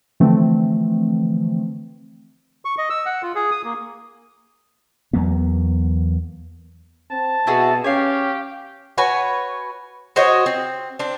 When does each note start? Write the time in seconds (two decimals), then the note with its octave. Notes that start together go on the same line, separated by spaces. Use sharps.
0.20 D3 E3 F3 A3 C4
2.65 C#6
2.78 D#5
2.90 E6
3.06 F#5
3.23 F4
3.35 G#4
3.51 D#6
3.64 A#3
5.13 E2 F#3 A#3 B3
7.11 C4 A5
7.47 B2 E4 F#4 G#4
7.84 C#4 G4 C#5 F5
8.98 F#4 B4 C#5 G#5
10.16 F#4 C5 C#5 D#5
10.46 C4
10.99 C4 D4